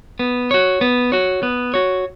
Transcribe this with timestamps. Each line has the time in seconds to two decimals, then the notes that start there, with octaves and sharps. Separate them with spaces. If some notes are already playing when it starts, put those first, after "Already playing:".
0.19 B3
0.51 F#4 C#5
0.81 B3
1.12 F#4 C#5
1.43 B3
1.74 F#4 C#5